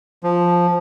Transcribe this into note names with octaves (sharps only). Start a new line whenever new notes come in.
F3